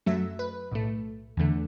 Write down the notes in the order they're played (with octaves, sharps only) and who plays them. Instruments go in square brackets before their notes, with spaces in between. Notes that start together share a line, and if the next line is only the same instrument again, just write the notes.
[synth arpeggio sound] F#2 F#3 A3 E5
B4
B1 A2 A3
E2 D3 A3